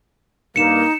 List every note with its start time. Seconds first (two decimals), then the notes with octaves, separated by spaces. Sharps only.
0.56 G2 A#3 D#4 C#7 E7